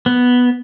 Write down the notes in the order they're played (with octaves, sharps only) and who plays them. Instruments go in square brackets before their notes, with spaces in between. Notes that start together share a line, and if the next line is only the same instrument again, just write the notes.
[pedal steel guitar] B3